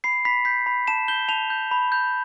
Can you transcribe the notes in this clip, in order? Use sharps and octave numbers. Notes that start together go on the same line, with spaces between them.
B5 C7
B5 B6
G6 B6
B5
A5 E7
G6 G7
A5 F7
G6
B5
G6